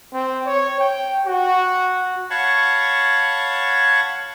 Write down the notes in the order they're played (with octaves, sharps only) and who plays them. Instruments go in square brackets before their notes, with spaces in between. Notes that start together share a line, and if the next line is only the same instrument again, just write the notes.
[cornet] C4
C#5
G5
F#4
[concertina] C#5 F5 F#5 A5 B5 C#6